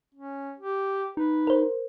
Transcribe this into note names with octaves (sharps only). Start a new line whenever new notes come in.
C#4
G4
D#4 B4
A#4 C5